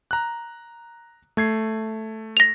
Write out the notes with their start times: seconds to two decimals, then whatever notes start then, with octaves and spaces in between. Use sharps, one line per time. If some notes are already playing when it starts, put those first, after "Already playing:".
0.11 A#5 F#6
1.37 A3 G#6 C7
2.37 A#6 F7